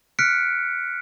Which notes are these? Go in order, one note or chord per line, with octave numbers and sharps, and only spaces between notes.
F6 F#6 B6 C#7 D7